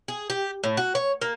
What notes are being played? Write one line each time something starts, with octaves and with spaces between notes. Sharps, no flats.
G#4
G4
A2
F#4
C#5
A#3